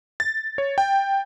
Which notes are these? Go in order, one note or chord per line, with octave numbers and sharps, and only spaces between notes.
A6
C#5
G5